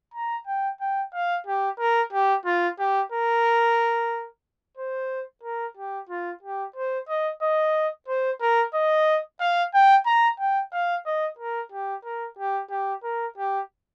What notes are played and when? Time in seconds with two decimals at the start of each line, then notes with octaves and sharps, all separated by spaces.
0.14 A#5
0.47 G5
0.81 G5
1.14 F5
1.47 G4
1.79 A#4
2.13 G4
2.45 F4
2.79 G4
3.12 A#4
4.77 C5
5.43 A#4
5.77 G4
6.09 F4
6.43 G4
6.76 C5
7.09 D#5
7.42 D#5
8.08 C5
8.42 A#4
8.74 D#5
9.40 F5
9.74 G5
10.06 A#5
10.39 G5
10.73 F5
11.06 D#5
11.39 A#4
11.72 G4
12.05 A#4
12.39 G4
12.71 G4
13.04 A#4
13.38 G4